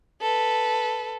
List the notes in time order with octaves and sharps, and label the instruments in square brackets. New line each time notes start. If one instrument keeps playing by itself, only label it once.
[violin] A4 B4